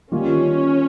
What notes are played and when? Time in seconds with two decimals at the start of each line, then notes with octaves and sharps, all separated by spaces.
0.12 D#3 G3 A#3 C#4 F4